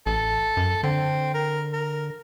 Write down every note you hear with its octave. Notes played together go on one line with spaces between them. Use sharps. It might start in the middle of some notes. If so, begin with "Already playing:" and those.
A1 A4
F#2
D3 C4
A#4
A#4